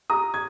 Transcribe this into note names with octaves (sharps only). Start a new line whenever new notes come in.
A#5 D#6
G#6